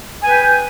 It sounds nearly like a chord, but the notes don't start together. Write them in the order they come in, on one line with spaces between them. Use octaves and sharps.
G#5 B4 G5